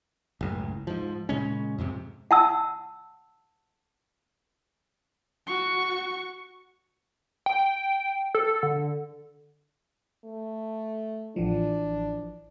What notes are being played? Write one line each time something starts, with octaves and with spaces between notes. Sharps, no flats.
F#1 C#2 A2
G#2 F3
A#2 C#3 G#3 C#4
F2 G#2 C3
F#5 A5 E6
F#4 C#6
G5
A4
D3
A3
A1 E3 F3 D4